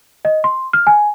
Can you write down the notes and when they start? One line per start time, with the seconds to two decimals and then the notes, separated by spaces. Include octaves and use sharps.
0.25 D#5
0.44 C6
0.73 F6
0.87 G#5